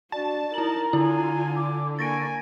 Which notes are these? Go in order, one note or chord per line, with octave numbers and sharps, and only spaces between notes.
D4 F#4 D5 A5
D#4 E4 A#4 A#5 F#7
D3 E4 F4 G#5
D6
A#3 G#5 C#6 A6 A#6 D7